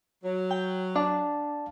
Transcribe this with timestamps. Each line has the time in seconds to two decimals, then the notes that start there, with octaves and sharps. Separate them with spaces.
0.24 F#3
0.51 G5
0.96 D4 D5 F5 A5